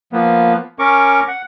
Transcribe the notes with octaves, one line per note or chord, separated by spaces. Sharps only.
F3 A#3 B3
C#4 A#4 C#6 D6
F#5